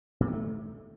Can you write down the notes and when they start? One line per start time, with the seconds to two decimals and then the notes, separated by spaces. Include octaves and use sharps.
0.20 A#2
0.27 D#3
0.34 A3